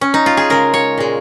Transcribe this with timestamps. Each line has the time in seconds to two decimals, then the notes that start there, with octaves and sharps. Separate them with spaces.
0.01 C#4
0.14 D#4
0.26 F4
0.37 G#4
0.50 C#3 G#3 A#4
0.74 C#5
0.98 A#2 G#3